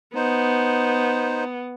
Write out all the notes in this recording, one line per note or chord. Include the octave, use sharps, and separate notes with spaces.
B3 D#4 C5